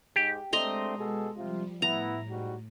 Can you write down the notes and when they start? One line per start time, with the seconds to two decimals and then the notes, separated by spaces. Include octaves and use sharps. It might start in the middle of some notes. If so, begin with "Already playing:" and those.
0.16 G#2 G4
0.53 G#3 A3 C4 D4 D#5 A#5 C6
0.98 B2 G#4 A4
1.37 C3 F3 G3 F4
1.82 A2 B3 E4 A#5
2.30 G#2 G3 F#4